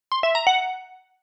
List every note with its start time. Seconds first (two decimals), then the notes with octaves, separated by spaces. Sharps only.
0.12 C6
0.23 E5
0.35 A#5
0.47 F#5